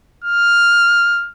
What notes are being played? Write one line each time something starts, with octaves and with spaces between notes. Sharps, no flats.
F6